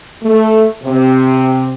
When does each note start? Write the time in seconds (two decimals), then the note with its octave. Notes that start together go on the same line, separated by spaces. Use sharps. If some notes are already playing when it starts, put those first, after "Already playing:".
0.23 A3
0.83 C3